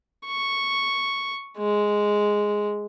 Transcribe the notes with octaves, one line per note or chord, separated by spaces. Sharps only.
C#6
G#3